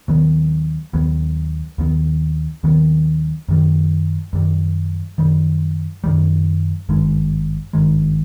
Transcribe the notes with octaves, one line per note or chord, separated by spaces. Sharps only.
D#2 D#3 F#3 B3
D#2 D#3 F#3 B3
D#2 D#3 F#3 B3
D#2 D#3 F#3 B3
F#2 D#3 G3
F#2 D#3 G3
F#2 D#3 G3
F#2 D#3 G3
G#1 G2 D#3 G#3
G#1 G2 D#3 G#3